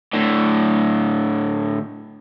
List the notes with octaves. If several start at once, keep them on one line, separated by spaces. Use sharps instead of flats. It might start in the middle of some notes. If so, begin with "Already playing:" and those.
A2 D3